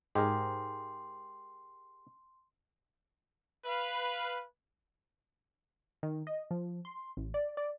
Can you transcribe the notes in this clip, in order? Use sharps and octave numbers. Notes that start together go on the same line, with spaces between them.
G#2 G4 G#4 A#4 C6
B4 F5
D#3
D#5
F3
C6
A1
D5
D5